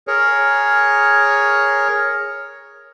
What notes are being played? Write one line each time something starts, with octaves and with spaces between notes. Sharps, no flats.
G#4 A#4 C#5